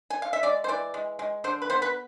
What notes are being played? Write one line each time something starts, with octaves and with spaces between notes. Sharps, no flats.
G#5
F5
E5
G#3 D5
C5
E3 D5
G#3
G#3
D3 C5
B4
B3 C5
B4